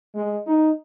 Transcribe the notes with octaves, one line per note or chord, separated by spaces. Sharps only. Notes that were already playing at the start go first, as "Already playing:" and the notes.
G#3
D#4